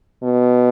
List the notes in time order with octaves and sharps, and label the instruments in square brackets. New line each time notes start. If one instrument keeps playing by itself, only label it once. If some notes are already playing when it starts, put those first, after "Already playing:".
[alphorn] B2